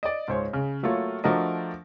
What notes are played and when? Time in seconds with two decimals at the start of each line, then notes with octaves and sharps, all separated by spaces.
0.03 D5 D#5
0.28 C#2 G#2 C5 C#5
0.53 C#3
0.83 F#3 A3 A#3 F4 C#5
1.24 F3 A3 D4 F#4 A#4 D#5